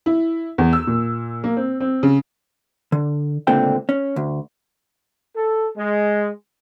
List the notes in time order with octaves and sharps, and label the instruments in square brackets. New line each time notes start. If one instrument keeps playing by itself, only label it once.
[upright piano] E4
E2
E6
A#2
A#3
C4
C4
C#3
[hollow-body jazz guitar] D3
C#2 A#2 D3 A3 C4 G5
C#4
D2
[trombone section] A4
G#3